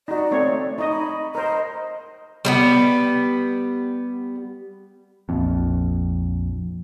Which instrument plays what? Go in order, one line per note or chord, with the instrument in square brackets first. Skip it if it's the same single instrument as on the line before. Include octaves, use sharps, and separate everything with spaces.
[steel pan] D#4 F#4 [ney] D5
[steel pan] A3 C4 C#5
[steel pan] D#4 D#5 [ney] C#6
[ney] B5
[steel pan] A#4 C5 [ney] D#5
[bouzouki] G3 A#3 B3
[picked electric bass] A#1 F2